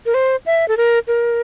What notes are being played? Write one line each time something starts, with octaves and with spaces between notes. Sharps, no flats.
A#4
C5
E5
A4
A#4
A#4